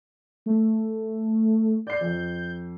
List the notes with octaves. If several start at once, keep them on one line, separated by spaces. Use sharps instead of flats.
A3
D5 G6 C7
F2